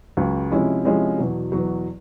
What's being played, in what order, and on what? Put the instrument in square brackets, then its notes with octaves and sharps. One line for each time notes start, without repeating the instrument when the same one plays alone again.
[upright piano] C#2 C#3 F#3
C3 F3 G#3 C#4 E4
C3 F3 G#3 C#4 E4
E2 B2 F#3
E2 B2 F#3